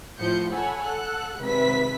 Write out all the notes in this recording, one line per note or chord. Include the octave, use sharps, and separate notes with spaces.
A2 F3 C5 G6 C#7
A4 C#5 F#5 G#5 B5
A4 F#5 F#6
G#1 C3 B4 E5 B6